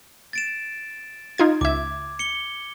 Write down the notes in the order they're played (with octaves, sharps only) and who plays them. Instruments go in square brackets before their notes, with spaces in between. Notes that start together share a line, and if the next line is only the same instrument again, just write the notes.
[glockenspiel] A6 D7 E7
[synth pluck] D#4 F4 G#6
[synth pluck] C#2 E5 [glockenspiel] D6 G#6
[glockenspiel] C#7 G7